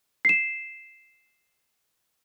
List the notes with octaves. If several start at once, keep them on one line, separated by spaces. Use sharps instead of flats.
C7 E7